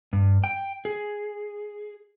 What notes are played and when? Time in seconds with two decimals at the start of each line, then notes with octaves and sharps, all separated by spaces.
0.13 G2
0.44 G5
0.85 G#4